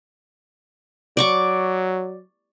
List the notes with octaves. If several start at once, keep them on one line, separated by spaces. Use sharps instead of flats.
F#3 D5 C#6 D6